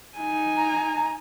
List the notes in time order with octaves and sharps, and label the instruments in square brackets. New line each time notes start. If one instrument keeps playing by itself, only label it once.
[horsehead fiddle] D#4 G#5
[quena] A#5